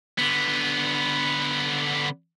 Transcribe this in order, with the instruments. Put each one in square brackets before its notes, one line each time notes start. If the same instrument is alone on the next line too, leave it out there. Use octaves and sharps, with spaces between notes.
[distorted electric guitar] D3 B3